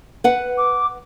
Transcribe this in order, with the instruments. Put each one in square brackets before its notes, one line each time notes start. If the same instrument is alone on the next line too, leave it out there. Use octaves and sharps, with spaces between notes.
[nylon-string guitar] B4 F#5
[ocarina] D6